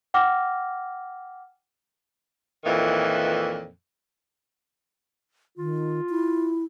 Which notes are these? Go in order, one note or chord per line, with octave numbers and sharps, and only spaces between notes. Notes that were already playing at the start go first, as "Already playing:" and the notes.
F#5 G5 D6 F6 A#6
F2 A#2 D#3 E3
D#3 F4
E4